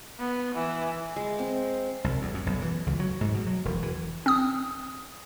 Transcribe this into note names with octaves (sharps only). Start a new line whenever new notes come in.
B3
E3
G#3
C4
C2
E2
F#2
B1
E3
C#2
F#3
G#2
B2
F#3
E1
E3
C4 D#6